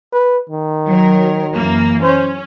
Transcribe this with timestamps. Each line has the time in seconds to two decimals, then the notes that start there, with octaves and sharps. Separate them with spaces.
0.13 B4
0.50 D#3
0.87 F#3 A#4
1.53 F#2 E3 A#3
2.03 C#4 C5